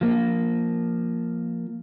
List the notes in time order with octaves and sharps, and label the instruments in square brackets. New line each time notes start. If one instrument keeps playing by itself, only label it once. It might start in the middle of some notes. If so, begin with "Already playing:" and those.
[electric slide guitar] F3 A#3